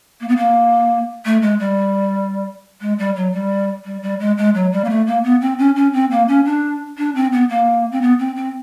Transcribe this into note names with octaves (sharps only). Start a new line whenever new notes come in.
A#3
B3
A#3
A3
G#3
G3
G#3
G3
F#3
G3
G3
G3
G#3
G#3
F#3
G3
A#3
A3
A#3
B3
C4
C#4
C#4
C4
A#3
C#4
D4
D4
C4
B3
A#3
C4
B3
C4
C4